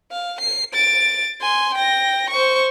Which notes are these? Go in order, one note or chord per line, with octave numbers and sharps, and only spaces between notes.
F5
C7
A6 D7
G#5 C6
G5 A#6
C5 C#6